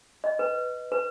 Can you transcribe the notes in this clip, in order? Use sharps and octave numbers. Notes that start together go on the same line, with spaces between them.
D#5
B4
B4